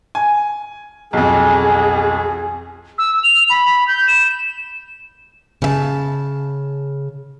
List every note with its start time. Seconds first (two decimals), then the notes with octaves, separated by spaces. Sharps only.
0.15 G#5
1.13 B1 F2 G#4
2.98 E6
3.23 F7
3.50 B5
3.88 G6
4.08 E7
5.62 C#3 E5 A5